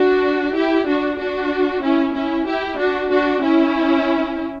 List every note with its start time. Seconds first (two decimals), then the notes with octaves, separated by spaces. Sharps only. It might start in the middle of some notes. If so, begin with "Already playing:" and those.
Already playing: D4 F#4
0.56 E4 G4
0.87 D4 F#4
1.19 D4 F#4
1.83 C#4 E4
2.15 C#4 E4
2.47 E4 G4
2.79 D4 F#4
3.11 D4 F#4
3.43 C#4 E4